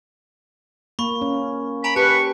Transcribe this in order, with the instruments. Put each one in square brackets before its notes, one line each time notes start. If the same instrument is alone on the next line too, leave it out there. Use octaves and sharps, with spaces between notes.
[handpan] A#3 [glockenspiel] B5 C#6
[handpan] C#4
[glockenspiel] G#5 A#5 D7 [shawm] B5
[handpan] G4 [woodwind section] B4 [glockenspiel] A5 [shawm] C#6